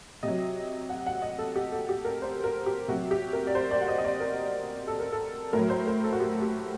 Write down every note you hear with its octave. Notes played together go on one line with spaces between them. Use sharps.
C3 F#3 D#5
F#5
F#5
D#5
A4
G4
A4
G4
A#4
C5
A#4
G4
C3 F#3 F#4
G4
A#4
D5
C5
D5
F#5
D#5
D#5
D5
A#4
A4
A#4
A4
A2 F#3 A#4
C5
A#4
A4
F#4
G4
G4